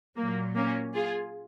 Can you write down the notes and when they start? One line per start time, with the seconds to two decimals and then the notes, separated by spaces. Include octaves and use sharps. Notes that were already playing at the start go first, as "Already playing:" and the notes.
0.17 A#2 F#3 A#3
0.56 A#3 C#4
0.95 F4 G#4